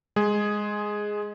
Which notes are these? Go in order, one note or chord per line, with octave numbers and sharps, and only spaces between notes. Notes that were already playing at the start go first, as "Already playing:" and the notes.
G#3 G#4